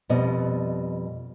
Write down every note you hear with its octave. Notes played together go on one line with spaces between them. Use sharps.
F2 B2 G3 D#5